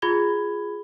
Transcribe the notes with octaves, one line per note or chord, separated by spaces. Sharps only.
F4 G#4 B5 G#6 G7